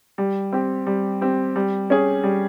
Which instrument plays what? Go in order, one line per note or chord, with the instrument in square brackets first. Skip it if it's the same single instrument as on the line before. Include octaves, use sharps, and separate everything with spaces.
[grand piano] G3
C4 G4
G3
C4 G4
G3
C#4 G#4
G3